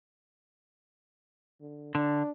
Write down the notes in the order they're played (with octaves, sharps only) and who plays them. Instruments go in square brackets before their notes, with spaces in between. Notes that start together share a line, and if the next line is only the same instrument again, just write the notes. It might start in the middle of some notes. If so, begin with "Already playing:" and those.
[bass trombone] D3
[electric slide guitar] D3 [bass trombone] D4